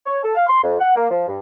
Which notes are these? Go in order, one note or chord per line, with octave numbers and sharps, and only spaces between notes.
C#5
A4
F5
C6
F2
F#5
A#3
F3
G2